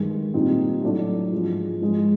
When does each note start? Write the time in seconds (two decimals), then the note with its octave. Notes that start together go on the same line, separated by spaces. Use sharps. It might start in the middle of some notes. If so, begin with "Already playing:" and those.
Already playing: G2 D#3 G#3
0.34 A#2 G3 C4 D#4
0.82 A2 F#3 A3 D4
1.32 G#2 F3 G#3
1.82 G#2 F3 G#3